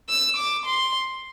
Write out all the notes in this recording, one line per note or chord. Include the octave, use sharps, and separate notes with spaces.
E6
D6
C6